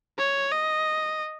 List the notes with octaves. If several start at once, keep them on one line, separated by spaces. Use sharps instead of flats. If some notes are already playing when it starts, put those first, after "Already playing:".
C#5
D#5